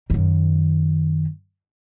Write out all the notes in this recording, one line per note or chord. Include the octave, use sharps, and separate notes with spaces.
F#2 D#3